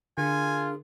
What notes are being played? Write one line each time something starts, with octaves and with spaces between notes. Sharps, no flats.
D3 D4 F4 G#4 A#4 G#5